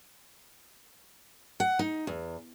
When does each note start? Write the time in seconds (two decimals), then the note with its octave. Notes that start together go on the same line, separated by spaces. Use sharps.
1.60 F#5
1.79 D#4
2.07 E2